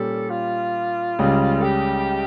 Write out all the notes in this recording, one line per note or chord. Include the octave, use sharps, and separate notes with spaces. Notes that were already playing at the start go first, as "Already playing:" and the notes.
Already playing: A#2 G3 C#4 G4 A4
F4
C#2 C#3 G3
A4
G4